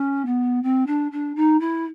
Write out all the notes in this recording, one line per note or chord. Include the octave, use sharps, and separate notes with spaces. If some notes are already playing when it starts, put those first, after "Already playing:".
Already playing: C#4
B3
C4
D4
D4
D#4
E4